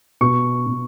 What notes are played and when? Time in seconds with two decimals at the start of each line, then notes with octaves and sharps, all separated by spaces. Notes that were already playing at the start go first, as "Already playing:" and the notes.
0.21 B2 C#6
0.67 B2